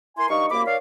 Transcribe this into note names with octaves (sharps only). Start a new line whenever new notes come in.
E4 A#4 G#5 C6
G2 D#4 F5 C#6
C2 F#2 A#3 B5 D6
D#3 C#5 D5 F5